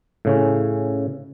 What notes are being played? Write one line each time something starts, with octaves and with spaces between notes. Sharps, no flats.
A2 C#3 C#4